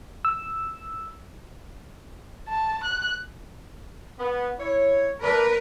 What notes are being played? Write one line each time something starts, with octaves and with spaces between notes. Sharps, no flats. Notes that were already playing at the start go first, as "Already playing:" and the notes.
E6
A5
F#6
B3
E4 C#5
A3 D4 A#4 B4